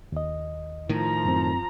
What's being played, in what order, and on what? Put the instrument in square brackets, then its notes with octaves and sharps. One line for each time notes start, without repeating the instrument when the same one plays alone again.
[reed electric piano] D#2 D#5
[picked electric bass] A2 D#3 [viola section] F3 A#5
[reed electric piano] F#2 C4